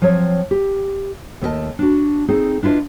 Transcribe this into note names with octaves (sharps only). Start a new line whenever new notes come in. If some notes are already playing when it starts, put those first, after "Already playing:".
F3 F#3 C4 C#5
G4
D#2 A3 B3 A#4 D#5 A5
D4 F#4
C4 D#4 G#4 A4
D4 E4 F4 B4 D#5